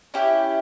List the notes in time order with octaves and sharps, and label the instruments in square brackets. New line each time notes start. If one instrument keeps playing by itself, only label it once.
[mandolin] C#4 E4 G4